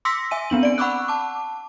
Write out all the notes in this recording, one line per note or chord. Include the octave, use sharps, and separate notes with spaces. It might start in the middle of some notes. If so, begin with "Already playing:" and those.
C6 D6 E6 A#6 B6 C#7
E5 G#5 D#7
B3 C4 D4 F#7
D5 D7
F#5 B5 C#6 D6 E6 F#6
A5 D6